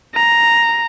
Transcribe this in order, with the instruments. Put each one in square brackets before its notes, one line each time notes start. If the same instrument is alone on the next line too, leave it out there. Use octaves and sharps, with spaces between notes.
[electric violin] A#5